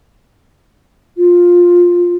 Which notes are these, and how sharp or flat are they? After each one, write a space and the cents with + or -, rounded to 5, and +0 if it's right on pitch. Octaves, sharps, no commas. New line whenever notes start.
F4 +10